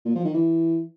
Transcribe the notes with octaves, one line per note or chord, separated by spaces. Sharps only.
A#2
F3
D#3
E3